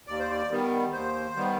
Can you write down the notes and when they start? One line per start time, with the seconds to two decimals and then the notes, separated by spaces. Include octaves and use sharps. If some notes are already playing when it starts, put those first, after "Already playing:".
0.07 D#2 D5
0.19 C5
0.31 D5
0.51 D#3 G3 B3
0.93 D#2 C5
1.36 D#3 G3 B3